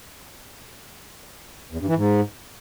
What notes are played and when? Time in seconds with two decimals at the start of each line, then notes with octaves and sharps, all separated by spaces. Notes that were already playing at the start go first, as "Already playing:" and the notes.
1.71 E2
1.80 G2
1.88 E3
1.96 G#2